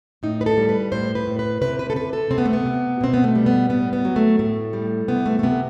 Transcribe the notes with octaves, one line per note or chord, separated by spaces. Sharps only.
A2 D#4
B4
A4
G3
B4
A2 C5
B4
A2
B4
C3 B4
B4
A4
C3 B4
A4
C3 C4
B3
A3
B3
C3
B2 C4
B3
A3
G3
B3
A2 B3
B3
F#3
A3
A2 A3
G3
C3 B3
A3
A3
C3 B3